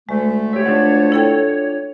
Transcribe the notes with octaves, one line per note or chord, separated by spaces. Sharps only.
D2 G#3 A3
G4 C#5 E5
D4 F4 F#5
E4 A4 G5